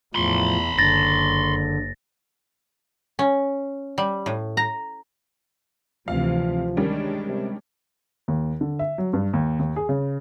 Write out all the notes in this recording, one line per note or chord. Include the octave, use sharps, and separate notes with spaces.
E2 A2 F3 B5 C6
F#1 D3 A6 A#6
C#4
G3
A2
A#5
D2 C3 E3 F3 F5
D#3 G3 G#3 C#4 D4
C3
D#2
D3
E5
F#3
G2
D#2
D#2
G#4
C#3